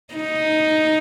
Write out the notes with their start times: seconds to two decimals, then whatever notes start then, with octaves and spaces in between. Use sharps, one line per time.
0.14 D#4